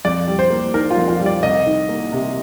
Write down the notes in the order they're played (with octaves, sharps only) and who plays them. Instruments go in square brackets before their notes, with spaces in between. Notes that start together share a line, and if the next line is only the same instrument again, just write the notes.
[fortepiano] F2 [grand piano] D5
[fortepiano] G3
[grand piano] C5
[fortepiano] A#3
[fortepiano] D#3 [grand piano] A#4
[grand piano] F4
[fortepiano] F2
[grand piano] F4
[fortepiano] G3
[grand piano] D5
[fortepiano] C2 [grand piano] D#5
[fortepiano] D#3
A#3
C3